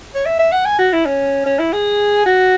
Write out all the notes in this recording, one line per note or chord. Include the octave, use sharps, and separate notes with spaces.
C#5
E5
E5
F#5
G#5
F#4
E4
C#4
C#4
E4
G#4
F#4